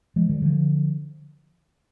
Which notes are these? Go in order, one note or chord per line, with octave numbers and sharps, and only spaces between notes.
F3 G#3
D#3 G3
D3 F3